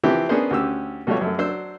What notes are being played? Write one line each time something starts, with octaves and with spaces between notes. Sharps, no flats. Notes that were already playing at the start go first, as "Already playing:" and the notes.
E3 F3 C4 E4 G4
B3 C#4 D4 G#4 A#4 C5
D2 C#4 G4 E6
B2 G3 A3 F4 C#5
F#2 A3
F#3 D4 C5 E6